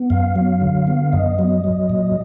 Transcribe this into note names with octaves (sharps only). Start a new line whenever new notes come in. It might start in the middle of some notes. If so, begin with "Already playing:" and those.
Already playing: B3
F#2 F5
F#3
D3
B3
F#2 D#5
F#3
F#3
A#2